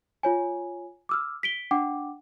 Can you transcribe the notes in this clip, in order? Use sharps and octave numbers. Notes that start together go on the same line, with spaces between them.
F4 C#5 G#5
D6 E6 F6
B6 D7 G7
D4 F#5 G5 D6